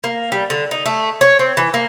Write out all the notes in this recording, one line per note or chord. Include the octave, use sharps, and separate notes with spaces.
A#3
G3
D3
D#4
A3
C#5
C4
E3
A#3